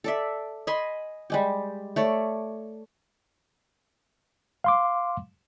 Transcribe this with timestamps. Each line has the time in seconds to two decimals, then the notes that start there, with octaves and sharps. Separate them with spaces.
0.04 A4 D5 E5
0.67 D#5 G#5 B5 C6
1.30 G3 G#3 G4
1.96 A3 C#5 D5
4.64 F5 C6 D6